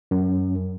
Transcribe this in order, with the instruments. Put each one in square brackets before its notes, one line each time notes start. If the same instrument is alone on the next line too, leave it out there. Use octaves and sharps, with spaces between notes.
[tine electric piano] F#2